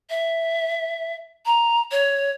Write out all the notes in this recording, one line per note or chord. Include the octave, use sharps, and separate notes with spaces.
E5
A#5
C#5